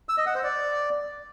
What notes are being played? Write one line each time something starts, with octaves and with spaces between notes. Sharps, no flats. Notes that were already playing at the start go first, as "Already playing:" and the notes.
E6
D#5
F#5
C5
D5